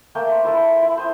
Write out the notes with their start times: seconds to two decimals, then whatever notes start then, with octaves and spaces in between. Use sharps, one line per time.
0.15 A3 A#3 G5
0.31 C5
0.44 E4 A4 B4
0.57 C6
0.82 E4
0.97 C5 G5 D#6